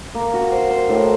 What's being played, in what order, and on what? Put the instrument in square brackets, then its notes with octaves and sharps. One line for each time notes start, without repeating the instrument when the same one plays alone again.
[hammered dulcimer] A#3
F#4
C5
C5
A2